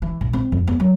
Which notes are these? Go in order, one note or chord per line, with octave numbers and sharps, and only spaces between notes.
E3
A#1
C4
F2
B3
F#3